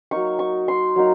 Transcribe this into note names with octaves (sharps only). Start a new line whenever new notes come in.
F#3 A#3 D#4 C#6
C#6
C6
F#3 A#3 D#4